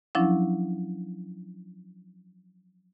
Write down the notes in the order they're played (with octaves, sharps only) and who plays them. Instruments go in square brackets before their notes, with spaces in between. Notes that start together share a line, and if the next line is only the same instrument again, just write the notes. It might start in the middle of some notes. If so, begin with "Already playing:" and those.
[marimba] F3 F#3 C#4 D4 E4